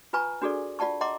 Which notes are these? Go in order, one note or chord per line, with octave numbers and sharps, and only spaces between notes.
F4 B4 G#5 A#5 C#6
D4 F#4 G#4 A4 D5
F4 D5 F#5 A5 C#6
D#5 F#5 A#5 C6 D6